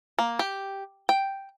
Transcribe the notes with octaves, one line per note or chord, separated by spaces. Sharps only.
A#3
G4
G5